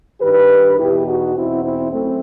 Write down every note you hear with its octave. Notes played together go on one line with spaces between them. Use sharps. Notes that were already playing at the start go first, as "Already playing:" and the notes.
G2 D#3 G4 B4
E2 B2 E4 G4
D#4 F#4
E2 B2 C4 E4
C4 E4
F#2 A3 C4